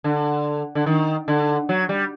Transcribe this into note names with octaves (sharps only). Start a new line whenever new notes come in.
D3
D3
D#3
D3
F#3
G3